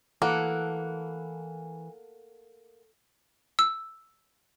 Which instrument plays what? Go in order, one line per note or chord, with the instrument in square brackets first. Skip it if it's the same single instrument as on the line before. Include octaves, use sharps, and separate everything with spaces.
[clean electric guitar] E3 [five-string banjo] A#3 [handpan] A4 F#5
[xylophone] E6